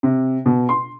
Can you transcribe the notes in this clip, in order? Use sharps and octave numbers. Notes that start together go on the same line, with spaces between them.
C3
B2
C6